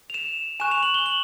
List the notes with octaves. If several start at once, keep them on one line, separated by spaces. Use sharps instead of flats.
F7
E7
G#5 C#6 F#6 E7
F7
F#7
G7
F#7